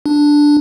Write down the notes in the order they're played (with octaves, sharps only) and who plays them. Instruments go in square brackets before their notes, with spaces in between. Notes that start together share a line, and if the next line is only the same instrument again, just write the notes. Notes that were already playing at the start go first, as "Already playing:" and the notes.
[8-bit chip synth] D4